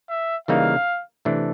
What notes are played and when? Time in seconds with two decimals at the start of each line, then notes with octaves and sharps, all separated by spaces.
0.09 E5
0.48 C#3 E3 G3 A#3 D#4 F5
1.25 C3 E3 A3 D4